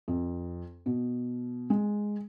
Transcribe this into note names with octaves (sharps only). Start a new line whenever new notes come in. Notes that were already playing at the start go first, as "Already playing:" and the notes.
F2
B2
G#3